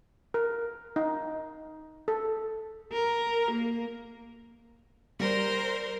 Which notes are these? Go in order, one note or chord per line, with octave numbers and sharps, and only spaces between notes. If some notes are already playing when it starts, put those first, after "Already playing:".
A#4
D#4
A4
A#4
A#3
G3 A#4 C5